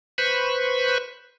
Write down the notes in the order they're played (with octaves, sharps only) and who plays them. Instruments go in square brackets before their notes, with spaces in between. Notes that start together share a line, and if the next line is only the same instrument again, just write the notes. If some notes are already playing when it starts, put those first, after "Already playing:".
[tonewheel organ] B4 C5 B5 C#6